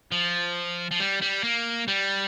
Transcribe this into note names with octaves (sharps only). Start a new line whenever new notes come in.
F3
F3
G3
G3
A#3
G3